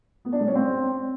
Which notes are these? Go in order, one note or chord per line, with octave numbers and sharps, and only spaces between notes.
B3
D4
G#3
C#4
C4